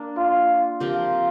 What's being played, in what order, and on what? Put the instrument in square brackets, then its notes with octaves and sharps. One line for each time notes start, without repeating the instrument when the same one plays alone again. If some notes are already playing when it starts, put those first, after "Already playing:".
Already playing: [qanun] A#3 D4
[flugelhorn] F4
[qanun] F3 C4 G4 A#4 [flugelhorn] F4